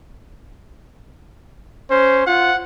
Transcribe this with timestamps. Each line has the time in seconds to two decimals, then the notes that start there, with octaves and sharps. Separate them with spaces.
1.90 C#4 C5
2.26 F4 F#5